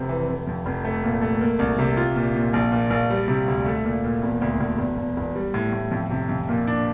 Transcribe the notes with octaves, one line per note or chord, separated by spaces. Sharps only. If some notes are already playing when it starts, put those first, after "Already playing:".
Already playing: F1 C3 C4
E3
F1
F2
F1
A3
A#2
A3
A#3
C2
C3
F4
A#2
A#2
A#1
A#2
A#1
G3
C3
D2
A3
A#2
A#2
E1
D2
D2
E1
E1
E1
G3
A2
A2
F2
C3
F2
A#2
D4